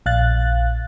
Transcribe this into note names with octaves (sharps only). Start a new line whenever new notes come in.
A#1 F5 F#6 A6